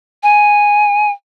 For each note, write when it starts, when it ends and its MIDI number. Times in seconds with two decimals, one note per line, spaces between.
0.23 1.10 80